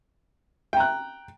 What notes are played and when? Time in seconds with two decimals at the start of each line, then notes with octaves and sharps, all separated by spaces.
0.73 G5
0.77 A#5
0.80 F#6